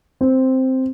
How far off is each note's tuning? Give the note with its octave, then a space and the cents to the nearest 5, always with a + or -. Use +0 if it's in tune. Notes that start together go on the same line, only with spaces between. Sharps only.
C4 +0